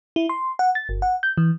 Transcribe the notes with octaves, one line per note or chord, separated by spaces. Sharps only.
E4
C6
F#5
A6
G1
F#5
G6
E3